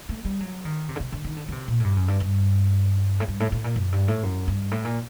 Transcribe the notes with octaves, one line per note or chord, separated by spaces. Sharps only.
A3
G3
F#3
D#3
C3
D3
C3
D3
D#3
D3
D3
C3
A#2
A2
G2
F#2
G2
G2
A2
G2
A2
A2
A#2
F#2
G2
A2
F#2
G2
A2
A#2